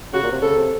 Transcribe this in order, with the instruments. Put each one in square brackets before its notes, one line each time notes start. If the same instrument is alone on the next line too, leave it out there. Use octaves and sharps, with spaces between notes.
[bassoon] C#3 [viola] F#4
[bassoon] A#2
C3
[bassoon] C#3 [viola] A4
[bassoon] C3